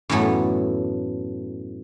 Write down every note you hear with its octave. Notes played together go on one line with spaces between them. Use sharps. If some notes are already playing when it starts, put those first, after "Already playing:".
F#2 A2 E3 A3 B3